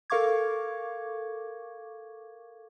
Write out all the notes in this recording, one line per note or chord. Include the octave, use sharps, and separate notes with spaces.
A4 A#4 F5 C#6 D6 G#6